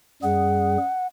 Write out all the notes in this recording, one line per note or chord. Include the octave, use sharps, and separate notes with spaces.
F#2 G3 G#4 F#5